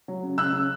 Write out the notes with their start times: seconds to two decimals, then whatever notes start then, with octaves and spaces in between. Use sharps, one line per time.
0.08 F#3
0.23 C#3
0.38 C#3 E6 F#6
0.53 C#3